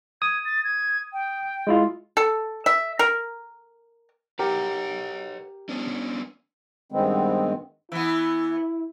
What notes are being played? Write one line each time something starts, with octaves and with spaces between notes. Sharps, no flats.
D#6 G#6
A6
G#6
G5
G#3 E4 F4
A4
E5
A#4
G4 A#4 B4 C#5 F#5
B3 C#4 D4
G2 D#3 G#3 B3 C4
E3 B3 E4